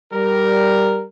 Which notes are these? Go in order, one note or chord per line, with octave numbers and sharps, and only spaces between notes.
G3 A#4